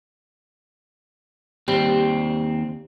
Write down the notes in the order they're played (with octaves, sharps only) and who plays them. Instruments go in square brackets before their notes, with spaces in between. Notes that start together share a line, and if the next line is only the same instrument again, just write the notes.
[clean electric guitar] D#2 C4 [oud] G3